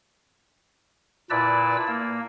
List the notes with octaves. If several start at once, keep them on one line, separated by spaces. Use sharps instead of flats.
A#2 E4 B4 D5 A5 E6
A#3